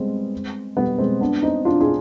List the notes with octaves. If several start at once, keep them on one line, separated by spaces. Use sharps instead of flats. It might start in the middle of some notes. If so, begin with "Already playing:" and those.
Already playing: G3 G#3 B3 C4
G3 B3
G#3 C4
B3 D4
C4 D#4
D4 F4
F4 G#4